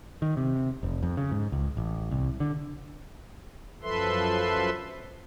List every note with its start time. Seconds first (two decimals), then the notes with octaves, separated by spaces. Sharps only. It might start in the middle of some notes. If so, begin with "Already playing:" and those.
0.22 D#3
0.37 C3
0.83 F1
1.03 F2
1.17 C#3
1.32 G#2
1.52 C#2
1.77 A1
2.11 C2
2.40 D3
3.82 F#2 F3 A4 B4 E5 C6